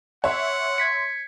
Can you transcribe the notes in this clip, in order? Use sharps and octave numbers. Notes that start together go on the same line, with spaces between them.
C#5 E5 F#5 C6
G#6 B6 C#7